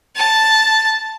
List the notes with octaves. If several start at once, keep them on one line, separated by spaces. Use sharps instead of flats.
A5